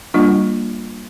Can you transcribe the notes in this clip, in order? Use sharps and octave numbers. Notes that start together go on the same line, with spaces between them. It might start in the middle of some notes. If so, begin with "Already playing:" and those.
G3 A#3 D4 F4